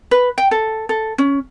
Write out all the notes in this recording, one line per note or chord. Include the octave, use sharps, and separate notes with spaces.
B4
G5
A4
A4
C#4